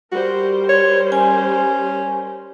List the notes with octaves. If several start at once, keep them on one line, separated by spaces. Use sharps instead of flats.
G3 F#4 A#4 C5
C#5
C#4 G#5